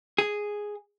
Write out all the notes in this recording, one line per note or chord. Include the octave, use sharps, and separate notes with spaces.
G#4